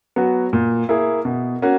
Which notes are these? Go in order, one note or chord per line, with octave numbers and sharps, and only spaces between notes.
F#3 B3 F#4
A#2
A#3 E4 G#4
B2
A#3 C#4 F#4